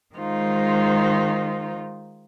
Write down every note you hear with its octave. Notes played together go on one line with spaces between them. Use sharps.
D#3 G#3 D#4 F4 C5